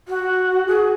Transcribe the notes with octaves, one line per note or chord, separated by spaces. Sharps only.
F#4
G#4